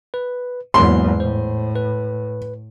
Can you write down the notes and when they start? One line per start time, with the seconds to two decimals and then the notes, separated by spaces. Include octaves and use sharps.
0.14 B4
0.74 E2 G#2 F#3 A#3 C6
1.20 A2 C5
1.75 B4